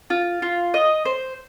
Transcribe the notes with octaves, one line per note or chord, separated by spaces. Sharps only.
F4
F4
D#5
C5